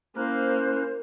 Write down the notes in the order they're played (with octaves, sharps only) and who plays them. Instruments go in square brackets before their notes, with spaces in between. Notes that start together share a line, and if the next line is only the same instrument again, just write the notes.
[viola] A#3 [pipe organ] C#4 E4 F#6 [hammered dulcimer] A#4 [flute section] C5